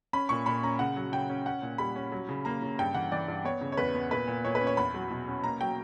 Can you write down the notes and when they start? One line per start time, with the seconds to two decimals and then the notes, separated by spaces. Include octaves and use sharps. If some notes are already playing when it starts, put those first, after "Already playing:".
0.13 C#4 B5
0.29 A#2 C#6
0.46 A#2 B5
0.63 C#4 A#5
0.79 C#3 F#5
0.96 F#3
1.12 C#3 G5
1.29 C#4
1.46 C#4 F#5
1.62 A#2
1.78 G3 B5
1.96 C#4
2.12 F#3
2.29 C#3
2.45 A#3 A#5
2.62 C#3
2.79 G2 G5
2.94 E3 F#5
3.12 E3 D5
3.28 G2
3.44 B3 C#5
3.61 C#3
3.72 C#5
3.77 E2 B4
3.95 B3
4.11 A#2 B4
4.27 A#2
4.45 A#2 C#5
4.55 B4
4.61 C#4
4.67 C#5
4.77 E2 B5
4.94 F#3
5.10 B2
5.27 C#4
5.44 A#3 A#5
5.61 F#3 G5